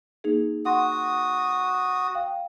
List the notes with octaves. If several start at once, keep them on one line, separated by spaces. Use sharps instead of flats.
A#3 D#4 G#4
F#4 F#5 C6 D#6
F5 G5